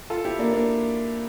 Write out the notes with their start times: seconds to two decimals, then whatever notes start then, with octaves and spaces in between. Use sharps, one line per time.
0.10 F4 A4
0.25 E4 G4
0.39 A#3 D4
0.53 A#3 D4